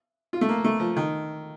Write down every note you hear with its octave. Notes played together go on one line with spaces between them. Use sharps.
F4
A3
A#3
A3
F3
D#3